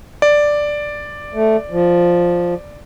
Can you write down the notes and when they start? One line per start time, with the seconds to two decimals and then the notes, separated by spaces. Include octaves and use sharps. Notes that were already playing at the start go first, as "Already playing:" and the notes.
0.22 D5
1.34 A3
1.71 F3